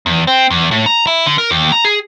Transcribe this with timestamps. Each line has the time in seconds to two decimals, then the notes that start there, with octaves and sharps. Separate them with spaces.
0.06 E2
0.27 C4
0.51 E2
0.71 A2
0.86 A#5
1.07 E4
1.26 D3
1.38 A#4
1.51 D#2
1.72 A#5
1.85 G#4